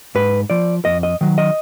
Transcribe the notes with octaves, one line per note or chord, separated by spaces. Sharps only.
G#2 B4
F3 D5
F2 D#5
D#5
D#3 F#3
D#5